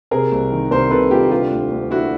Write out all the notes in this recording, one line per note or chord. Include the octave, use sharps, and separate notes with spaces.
C3 G#4 A#4
C2
D#3
C2 A#4 C5
C3 A4 B4
C2 F4 G4
D3 F4 G4
D2
D2
D3 E4 F#4